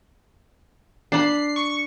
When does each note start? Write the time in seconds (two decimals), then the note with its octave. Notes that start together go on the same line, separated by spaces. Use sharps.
1.12 D4 B5 C7
1.56 C#6